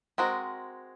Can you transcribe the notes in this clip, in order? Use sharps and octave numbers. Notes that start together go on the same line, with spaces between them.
G#3 C4 F#4 A#4 D#5